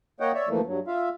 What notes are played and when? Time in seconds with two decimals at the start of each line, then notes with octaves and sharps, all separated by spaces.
0.20 A#3 C#5 D#5 F#5 G5
0.34 C#5 D5 E5
0.49 D2 E3 F3 A3 A#3
0.66 G2 F#3
0.87 F4 E5 F5